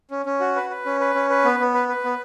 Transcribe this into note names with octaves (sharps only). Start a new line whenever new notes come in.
C#4
C#4
F#4
B4
B4
C#4
B4
C#4
B4
B3
B3
B4
B4
B3